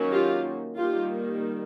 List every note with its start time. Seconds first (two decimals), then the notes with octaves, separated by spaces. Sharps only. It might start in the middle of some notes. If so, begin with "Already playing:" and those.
Already playing: D#3 F#3 A#3 C#4
0.11 F4 G4
0.77 D#3 G3 A#3 F4 G4